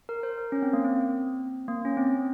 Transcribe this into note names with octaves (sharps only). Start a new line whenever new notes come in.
A#4
C5
A#4
C#4
C4
A#3
C4
A#3
C#4
C4